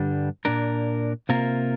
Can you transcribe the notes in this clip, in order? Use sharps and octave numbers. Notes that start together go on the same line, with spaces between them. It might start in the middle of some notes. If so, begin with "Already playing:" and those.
Already playing: G2 D3 G3 D4
A#2 A#3 D4 A#4
C3 A#3 F4 A#4